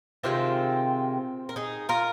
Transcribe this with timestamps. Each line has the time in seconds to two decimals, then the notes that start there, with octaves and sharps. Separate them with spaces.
0.23 C3 D#3 G#3 C4 F4
1.49 A#4
1.56 D#4 G#4
1.89 F4 A#4